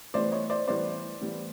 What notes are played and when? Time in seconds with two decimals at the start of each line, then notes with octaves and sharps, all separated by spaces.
0.14 A2 E3 G3 B3 C5 D5
0.32 C#5 D#5
0.50 C5 D5
0.67 A2 E3 G3 B3 C5 D5
1.21 A2 E3 G3 B3